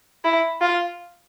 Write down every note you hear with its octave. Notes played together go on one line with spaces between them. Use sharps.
E4
F4